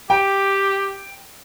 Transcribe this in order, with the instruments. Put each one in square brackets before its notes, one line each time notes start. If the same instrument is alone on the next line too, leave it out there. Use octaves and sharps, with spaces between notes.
[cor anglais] G4 [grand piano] G5